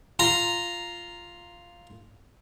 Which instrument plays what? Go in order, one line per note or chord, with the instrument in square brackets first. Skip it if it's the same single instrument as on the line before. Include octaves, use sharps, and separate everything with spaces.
[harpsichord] F4 A#5